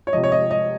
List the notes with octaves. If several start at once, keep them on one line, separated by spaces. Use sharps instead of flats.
C#5
C3 F3 D#5
C#5
D#5
D#5